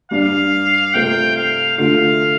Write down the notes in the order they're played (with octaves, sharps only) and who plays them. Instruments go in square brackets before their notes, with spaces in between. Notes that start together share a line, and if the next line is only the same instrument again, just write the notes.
[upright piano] G2 G3 D4 G4 D5 [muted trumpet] F5
[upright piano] C3 A3 F4 C5 [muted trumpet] G5
[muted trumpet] F5
[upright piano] D3 A3 F4 [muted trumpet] F5